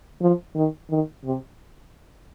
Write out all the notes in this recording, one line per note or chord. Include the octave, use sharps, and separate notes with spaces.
F3
D#3
D#3
C3